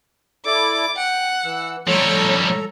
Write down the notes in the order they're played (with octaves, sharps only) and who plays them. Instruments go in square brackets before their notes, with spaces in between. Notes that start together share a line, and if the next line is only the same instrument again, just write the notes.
[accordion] E4 A4 D5 [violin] D6
[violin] F#5 [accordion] G5
[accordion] E3 E6
[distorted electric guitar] F3 G3 [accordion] A4 A#5 [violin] C#5